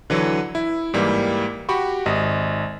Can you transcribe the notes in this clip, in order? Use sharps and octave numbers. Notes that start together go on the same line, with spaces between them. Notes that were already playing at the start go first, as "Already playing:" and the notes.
D3 E3 F#3
E4
G#2 E3 G3 A#3
F#4 G4 B5 C#6
G#1 D#5